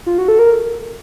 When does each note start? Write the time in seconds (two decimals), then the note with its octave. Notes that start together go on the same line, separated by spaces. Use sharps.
0.06 F4
0.18 F#4
0.28 A4
0.39 A#4